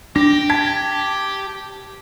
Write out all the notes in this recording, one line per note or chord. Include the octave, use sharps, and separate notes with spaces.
D4 G4 A#6
A5 G#6 B6